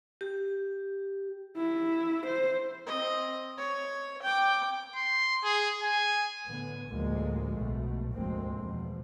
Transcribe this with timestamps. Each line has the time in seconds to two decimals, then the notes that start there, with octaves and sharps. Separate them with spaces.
0.21 G4
1.57 E4
2.27 C5
2.86 C4 D#5
3.58 C#5
4.22 G5 D6
4.96 C6
5.43 G#4
5.83 G#5
6.47 A2 D3 B3
6.89 D2 A2 D3 F3 G#3 A#3
7.56 B1 B2 A3
8.13 F1 D2 G#2 G#3 A#3 C4
8.58 E2 G2 B2 F3